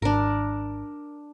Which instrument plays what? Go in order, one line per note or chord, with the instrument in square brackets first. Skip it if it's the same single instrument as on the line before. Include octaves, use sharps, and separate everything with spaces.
[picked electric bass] G#1 [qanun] D4 A#4